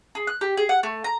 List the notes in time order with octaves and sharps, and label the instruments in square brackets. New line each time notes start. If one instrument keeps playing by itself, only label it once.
[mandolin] G#4
F#6
G4
G#4
F#5
A3
A#5